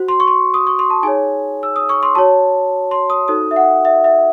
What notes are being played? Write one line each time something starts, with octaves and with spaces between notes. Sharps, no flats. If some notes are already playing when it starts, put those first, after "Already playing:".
Already playing: F#4 C5
C6
C#6
C6
D#6
C#6
C6
A5
D#4 G#4 C#5 G#5
E6
D#6
C#6
C6
F#4 C#5 A5
C6
D#6
D#4 F#4 A4 C5 D#6
E5
F#5
E5
E5